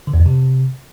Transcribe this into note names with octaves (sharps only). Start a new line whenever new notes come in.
D3
E2
F2
C3